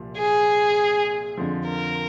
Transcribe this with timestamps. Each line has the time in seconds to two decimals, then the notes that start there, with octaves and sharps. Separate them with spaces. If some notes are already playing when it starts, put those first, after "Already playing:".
Already playing: C2 A#2 F3
0.18 G#4
1.37 F2 D3 F3
1.68 A#4